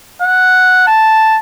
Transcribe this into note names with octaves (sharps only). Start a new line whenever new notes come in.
F#5
A5